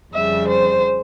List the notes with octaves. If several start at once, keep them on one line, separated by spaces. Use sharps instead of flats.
F2 C#3 G3 E5
C5